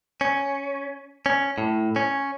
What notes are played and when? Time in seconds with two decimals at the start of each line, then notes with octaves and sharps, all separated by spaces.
0.21 C#4
1.26 C#4
1.58 A2
1.96 C#4